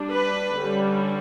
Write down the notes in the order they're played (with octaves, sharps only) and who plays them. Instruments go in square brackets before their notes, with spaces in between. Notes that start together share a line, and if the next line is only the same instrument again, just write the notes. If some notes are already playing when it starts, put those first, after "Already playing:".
Already playing: [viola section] G3 D4
B4
D3 G3 C#4